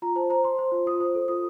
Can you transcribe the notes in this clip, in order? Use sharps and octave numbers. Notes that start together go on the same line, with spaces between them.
F4 A#5
C5 A5
C5 A#5
C5 C6
C5
F4
F4 D#6
C5
A4
F4 D#6